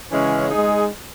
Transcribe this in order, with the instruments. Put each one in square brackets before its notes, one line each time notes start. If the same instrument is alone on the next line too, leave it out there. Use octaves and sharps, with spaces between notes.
[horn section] C#3 E3 G#3 C#4
G#3 D#4 G#4